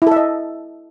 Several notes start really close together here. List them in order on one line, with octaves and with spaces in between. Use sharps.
E4 A4 E5 D#5